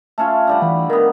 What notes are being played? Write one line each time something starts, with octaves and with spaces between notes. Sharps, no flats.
A3 C#4 F4 A5
D3 G3 F#5
E3 B5
D#3 B3 A#4